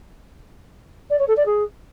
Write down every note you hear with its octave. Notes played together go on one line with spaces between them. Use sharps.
D5
C#5
A4
D5
G#4